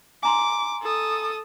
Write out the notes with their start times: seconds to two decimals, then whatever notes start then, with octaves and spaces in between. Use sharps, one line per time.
0.23 G#5 A#5 C6 D6
0.82 A4 D#6